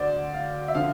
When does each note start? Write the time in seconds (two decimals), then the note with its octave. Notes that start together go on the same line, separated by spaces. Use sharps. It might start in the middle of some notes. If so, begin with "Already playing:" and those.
Already playing: D2 D3 C5 D5
0.33 F5
0.68 E5
0.75 D3 F3 F5